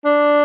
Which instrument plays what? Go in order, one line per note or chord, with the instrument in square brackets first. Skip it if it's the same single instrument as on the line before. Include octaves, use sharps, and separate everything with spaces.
[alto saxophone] D4